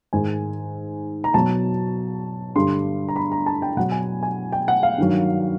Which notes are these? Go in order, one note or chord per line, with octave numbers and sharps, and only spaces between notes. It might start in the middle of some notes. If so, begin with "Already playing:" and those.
G#2 D#3 G#3 G#5
A#5
B2 F#3 A5
G2 D3 G3 C6
A#5
B5
A#5
A5
G5
B2 F#3 F#5
G#5
G#5
G5
F#5
F5
G2 D#3 F#3